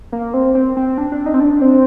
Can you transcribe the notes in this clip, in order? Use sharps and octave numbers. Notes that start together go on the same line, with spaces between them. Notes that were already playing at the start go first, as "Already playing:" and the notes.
A#3
C4
C4
C4
D4
D4
D#4
C4
D4
C4